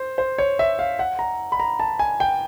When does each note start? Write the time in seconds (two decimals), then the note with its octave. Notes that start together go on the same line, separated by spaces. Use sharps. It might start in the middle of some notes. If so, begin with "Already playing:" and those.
Already playing: C5
0.18 C5
0.38 C#5
0.59 E5
0.79 F5
0.99 F#5
1.19 A#5
1.52 B5
1.60 A#5
1.80 A5
1.99 G#5
2.20 G5